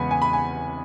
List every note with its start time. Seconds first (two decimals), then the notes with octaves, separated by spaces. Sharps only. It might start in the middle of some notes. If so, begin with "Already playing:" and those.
Already playing: E2 C#3 G#3 B3 F#5 G#5 B5
0.11 G#5
0.22 B5
0.33 G#5